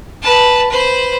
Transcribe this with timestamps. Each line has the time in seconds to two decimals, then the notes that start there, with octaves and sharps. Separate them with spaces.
0.22 B4 A5
0.69 B4 C5